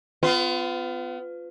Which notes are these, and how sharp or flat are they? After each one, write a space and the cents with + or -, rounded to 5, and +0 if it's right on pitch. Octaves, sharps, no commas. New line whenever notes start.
B3 +35 F4 +0